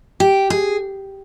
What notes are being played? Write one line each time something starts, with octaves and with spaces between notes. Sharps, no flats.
G4
G#4